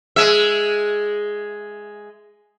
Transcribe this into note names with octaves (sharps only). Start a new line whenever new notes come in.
G#3 E5